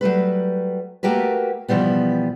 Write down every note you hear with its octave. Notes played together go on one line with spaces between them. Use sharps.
F#3 G3 A3 B4
A3 A#3 F#4 G4 A#4 B4
B2 E3 F3 G3 B3